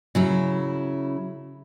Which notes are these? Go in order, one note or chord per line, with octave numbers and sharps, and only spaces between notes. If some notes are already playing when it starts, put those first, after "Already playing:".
C#3 F#3 E4